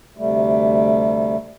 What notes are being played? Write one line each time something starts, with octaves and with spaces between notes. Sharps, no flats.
D2 C3 G3 A3